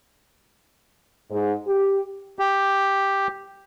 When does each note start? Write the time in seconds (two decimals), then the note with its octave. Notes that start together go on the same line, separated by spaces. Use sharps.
1.31 G#2
1.67 G4
2.39 G4